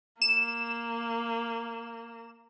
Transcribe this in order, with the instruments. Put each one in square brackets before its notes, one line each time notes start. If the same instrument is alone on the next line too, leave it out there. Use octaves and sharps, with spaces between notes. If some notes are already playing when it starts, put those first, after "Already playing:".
[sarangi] A#3 [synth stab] E7